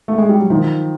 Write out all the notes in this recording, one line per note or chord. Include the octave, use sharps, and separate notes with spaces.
A3
G#3
G3
F#3
D#3 F3